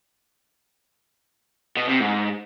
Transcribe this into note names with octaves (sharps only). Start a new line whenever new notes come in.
B2
C3
G#2